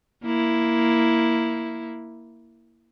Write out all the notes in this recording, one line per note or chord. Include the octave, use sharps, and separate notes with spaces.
A#3 E4